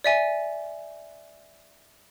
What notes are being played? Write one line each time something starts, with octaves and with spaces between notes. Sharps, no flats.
D5 E5 G#5